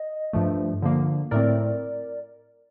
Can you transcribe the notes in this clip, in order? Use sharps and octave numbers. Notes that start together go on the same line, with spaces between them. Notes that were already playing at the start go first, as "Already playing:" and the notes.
Already playing: D#5
G2 F3 A3
D3 F3 A#3
A2 A3 C4 A#4 D5